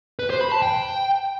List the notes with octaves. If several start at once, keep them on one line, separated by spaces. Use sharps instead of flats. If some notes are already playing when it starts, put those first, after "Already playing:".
B4
C5
B5
A5
G5